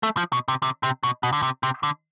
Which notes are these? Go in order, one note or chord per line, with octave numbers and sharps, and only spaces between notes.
A3
F3
B2
C3
C3
C3
B2
B2
D3
C3
C3
D3